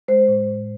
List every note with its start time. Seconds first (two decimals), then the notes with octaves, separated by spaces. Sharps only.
0.08 G#3 C5
0.28 A2